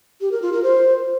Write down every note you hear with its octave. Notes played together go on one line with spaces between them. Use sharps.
G4
A#4
F4
A#4
C5